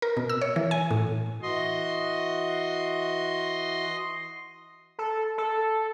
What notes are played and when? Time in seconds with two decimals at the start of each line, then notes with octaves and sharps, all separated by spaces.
0.02 A#4
0.17 B2
0.29 E6
0.41 C#5
0.56 E3
0.71 G#5
0.91 A2
1.42 E3 F#4 D#5 C6
4.99 A4
5.38 A4